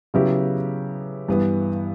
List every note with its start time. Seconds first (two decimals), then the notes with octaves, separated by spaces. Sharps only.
0.14 C#3 F#3 B3 E4 G4
1.28 G2 E3 B3